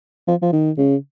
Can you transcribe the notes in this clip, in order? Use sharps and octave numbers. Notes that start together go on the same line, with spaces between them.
F3
F3
D#3
C#3